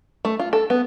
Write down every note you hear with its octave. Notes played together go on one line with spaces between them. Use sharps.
A3
F4
A4
B3